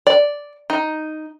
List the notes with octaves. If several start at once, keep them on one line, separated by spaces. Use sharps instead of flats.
D5
D#4